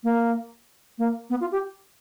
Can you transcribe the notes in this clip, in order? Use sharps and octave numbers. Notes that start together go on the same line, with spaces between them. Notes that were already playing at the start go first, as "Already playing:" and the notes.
A#3
A#3
B3
F4
G4